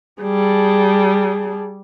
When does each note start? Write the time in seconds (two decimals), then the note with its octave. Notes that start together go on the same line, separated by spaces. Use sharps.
0.22 G3 G#4 A5